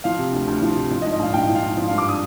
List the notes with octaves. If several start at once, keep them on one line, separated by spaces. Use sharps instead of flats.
F3 F5
C3
D2
D2
F3
C3
F3
D#5
G#2
D#5
A#1 F5
A#1 G5
F3
F5
G#2
F3
F5
G2
D6
D#6